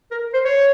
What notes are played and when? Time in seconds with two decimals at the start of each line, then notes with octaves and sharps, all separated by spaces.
0.11 A#4
0.34 C5
0.45 C#5